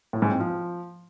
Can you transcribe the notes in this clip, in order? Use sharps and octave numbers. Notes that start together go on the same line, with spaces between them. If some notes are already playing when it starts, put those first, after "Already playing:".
A2
G#2
C4
F3